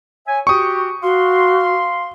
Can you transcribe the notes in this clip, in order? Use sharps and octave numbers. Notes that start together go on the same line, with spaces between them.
C#5 E5 G#5
F#4 G4 C#6 D#6
F#4 F5 C6